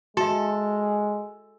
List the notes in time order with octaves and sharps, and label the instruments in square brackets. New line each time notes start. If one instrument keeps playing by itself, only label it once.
[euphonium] G#3 [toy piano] F#4 E5 [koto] A4